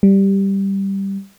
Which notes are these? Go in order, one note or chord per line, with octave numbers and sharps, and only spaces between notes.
G3